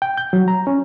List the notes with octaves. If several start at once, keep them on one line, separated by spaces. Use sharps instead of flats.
G5
G6
F#3
A#5
C#4